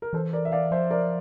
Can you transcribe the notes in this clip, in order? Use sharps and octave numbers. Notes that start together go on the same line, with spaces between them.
A#4
E3 A4 C5
A#4 D5
E5
D5 F5
F3 C5 E5
A#4 D5